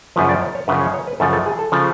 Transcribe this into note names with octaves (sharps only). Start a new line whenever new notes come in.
F#2 C#3 F3 B4
D5
C#5
C#5
F#2 C#3 F3 B4
C#5
C#5
B4
F#2 C#3 F3 A4
A4
G#4
A4
C#3 F3